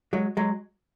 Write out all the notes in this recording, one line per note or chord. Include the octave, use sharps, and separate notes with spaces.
F#3 G#3
F#3 G#3